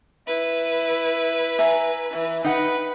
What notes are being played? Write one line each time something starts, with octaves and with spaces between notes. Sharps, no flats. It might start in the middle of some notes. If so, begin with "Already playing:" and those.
E4 B4
E5 G#5 A#5
E3
D#4 B4 F#5 G5